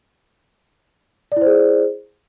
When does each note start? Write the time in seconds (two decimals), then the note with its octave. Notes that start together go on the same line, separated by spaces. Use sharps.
1.32 D5
1.37 E4
1.41 C5
1.46 G#4